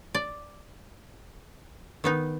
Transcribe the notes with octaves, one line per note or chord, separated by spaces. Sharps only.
D5
D#3 B3 D#4